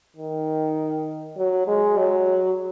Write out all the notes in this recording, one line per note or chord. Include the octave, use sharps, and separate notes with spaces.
D#3
F#3
G#3
F#3